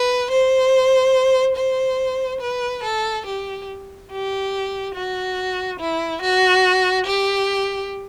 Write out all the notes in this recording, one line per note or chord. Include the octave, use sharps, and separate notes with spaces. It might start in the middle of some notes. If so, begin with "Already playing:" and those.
Already playing: B4
C5
C5
B4
A4
G4
G4
F#4
E4
F#4
G4